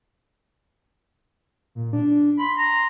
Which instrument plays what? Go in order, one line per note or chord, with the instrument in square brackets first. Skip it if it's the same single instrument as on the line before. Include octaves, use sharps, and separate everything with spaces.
[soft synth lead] A#2
D4
[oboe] B5 [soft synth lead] C6
[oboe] A#5